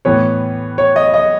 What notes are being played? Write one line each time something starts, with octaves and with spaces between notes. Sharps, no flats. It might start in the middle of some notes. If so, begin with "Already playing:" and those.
A2 E3 B3 C#5
C#5
D#5
D#5